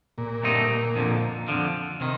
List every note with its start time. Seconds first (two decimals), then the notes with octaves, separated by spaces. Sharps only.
0.18 A#2
0.43 G2 D3 A3 C4 D#4
0.96 F2 D3 F3
1.48 F2 D3 F3
2.00 C3 D#3